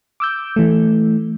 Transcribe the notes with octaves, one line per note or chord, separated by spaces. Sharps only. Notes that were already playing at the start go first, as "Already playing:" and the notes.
D6 E6 G6
E3 A3